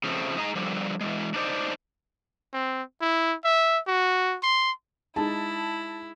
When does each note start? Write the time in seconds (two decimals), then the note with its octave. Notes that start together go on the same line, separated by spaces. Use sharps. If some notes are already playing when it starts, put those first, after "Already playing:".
0.04 C#3 F3 A3 C4
0.36 G#2 D#4 G#4 D#5 G#5 A#5
0.55 D3 F3 G3
1.01 E3 G3 G#3
1.34 D4 D#4 C5 D5
2.53 C4
3.01 E4
3.44 E5
3.87 F#4
4.43 C6
5.16 G#3 D#4 E4 A5